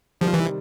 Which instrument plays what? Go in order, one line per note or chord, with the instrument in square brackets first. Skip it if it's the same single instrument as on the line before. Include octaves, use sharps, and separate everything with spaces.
[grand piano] C3 D#3 G3 [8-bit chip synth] F3
[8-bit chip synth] E3